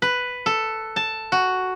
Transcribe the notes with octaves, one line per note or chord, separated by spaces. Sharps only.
B4
A4
A5
F#4